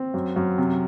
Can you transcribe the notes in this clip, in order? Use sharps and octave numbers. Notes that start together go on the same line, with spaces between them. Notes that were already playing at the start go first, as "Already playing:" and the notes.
Already playing: C4
F#2
F#2
C3